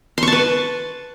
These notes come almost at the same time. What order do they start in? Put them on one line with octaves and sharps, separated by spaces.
C6 C#6 A5 B4